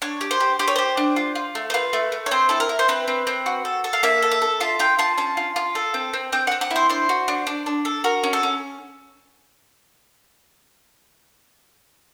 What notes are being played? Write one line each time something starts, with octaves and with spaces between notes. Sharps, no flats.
D4 C#5
G4
C5
G4
G4 C5
C#5
G4 C5
D4
F4
F4
A3
C5
F4 B4
A3
A3
C#5
C4 C5
E4 A4
A#4
E4
C5
C4 B4
C4
C4
F#4
A4
A4
F5
A#3 E5
A4
E5
A4
F4 E5
F4 G5
F4 A5
C#4 A5
F4
F4
A4
C4
C4
C4 G5
C4 F#5
F#5
E4
C5
D4 C5
F#4
D4
D4
D4
A4
F#4 A#4
C#4
A4
C#4